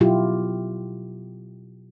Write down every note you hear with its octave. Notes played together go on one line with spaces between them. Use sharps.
B2 F#3 E4 F4 G4